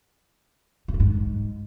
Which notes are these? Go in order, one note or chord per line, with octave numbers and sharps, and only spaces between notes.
G#2
A2
G#2